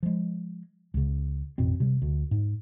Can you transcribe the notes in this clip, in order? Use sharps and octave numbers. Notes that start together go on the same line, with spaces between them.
F3 G#3
C#2 C#3
A1 F2 B2 C4
C3 G3
D2
G#2